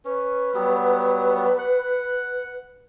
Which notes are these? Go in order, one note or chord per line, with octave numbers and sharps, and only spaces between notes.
C#4 B4
F#3 G3 B3
F#5